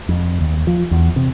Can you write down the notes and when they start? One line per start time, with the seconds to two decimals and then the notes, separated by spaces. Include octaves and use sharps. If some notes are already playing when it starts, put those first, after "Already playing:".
0.09 F2
0.41 D#2
0.67 F3
0.91 E2
1.16 C3